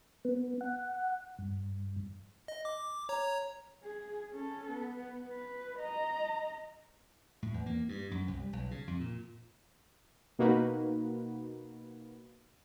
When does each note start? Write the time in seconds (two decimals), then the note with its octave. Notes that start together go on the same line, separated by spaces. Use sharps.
0.25 B3
0.61 F#5
1.39 G2
2.48 D#5
2.65 D6
3.09 C#5 A#5
3.83 G#4
4.31 C#4 A4
4.71 B3
5.27 B4
5.79 D#5 A#5
7.42 A2
7.54 E2
7.66 A#3
7.89 G2
8.11 F#2
8.28 C2
8.40 G3
8.53 B1
8.71 C#3
8.87 F2
9.00 A#2
10.39 B2 A#3 D#4 F#4 B4